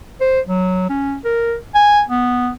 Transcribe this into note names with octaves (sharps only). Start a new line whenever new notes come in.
C5
F#3
C#4
A#4
G#5
B3